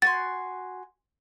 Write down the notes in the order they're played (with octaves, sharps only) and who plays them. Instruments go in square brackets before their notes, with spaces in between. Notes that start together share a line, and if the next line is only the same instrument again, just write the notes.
[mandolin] F#4 G#5 C6 [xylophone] A6